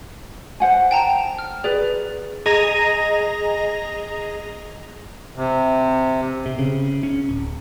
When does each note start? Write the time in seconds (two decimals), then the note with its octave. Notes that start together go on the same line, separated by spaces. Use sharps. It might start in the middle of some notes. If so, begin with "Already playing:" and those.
0.60 C5 F#5 G#5
0.91 G5 A5 A#5
1.39 F6
1.64 G#4 B4 D5
2.46 G#4 D#5 A#5 A#6 F7
5.36 C3
6.46 C3
6.59 C#3
7.03 C#4
7.29 D1